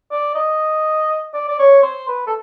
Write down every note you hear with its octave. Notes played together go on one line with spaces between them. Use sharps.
D5
D#5
D5
D5
C#5
C5
B4
A4